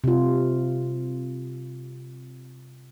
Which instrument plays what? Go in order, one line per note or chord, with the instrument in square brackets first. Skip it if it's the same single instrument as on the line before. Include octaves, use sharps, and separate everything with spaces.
[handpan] C3 F4